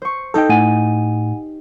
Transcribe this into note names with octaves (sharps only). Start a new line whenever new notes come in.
C5 C#6
D#4 G4 A4 G5
A2 F#5 G#5 D#7